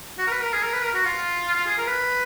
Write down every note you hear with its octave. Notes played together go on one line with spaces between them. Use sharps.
F#4
A#4
B4
A#4
G#4
A#4
B4
A#4
F#4
F4
F4
G#4
A#4
B4